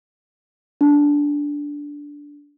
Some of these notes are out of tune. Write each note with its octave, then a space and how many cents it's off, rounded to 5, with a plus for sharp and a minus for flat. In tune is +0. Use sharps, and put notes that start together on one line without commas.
D4 -10